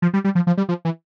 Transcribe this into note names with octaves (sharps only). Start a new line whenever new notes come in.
F3
G3
G3
F3
F3
G3
F3
E3